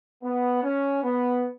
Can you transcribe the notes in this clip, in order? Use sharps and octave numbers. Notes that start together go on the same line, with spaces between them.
B3
C#4
B3